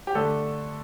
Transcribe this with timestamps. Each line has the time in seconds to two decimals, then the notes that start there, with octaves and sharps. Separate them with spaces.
0.07 G4
0.15 D3 A3 D4 A4